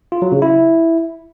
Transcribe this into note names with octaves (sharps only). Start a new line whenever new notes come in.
F4
F#3
C#3
E4